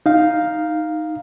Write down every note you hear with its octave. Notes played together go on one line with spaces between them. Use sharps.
D#4 F5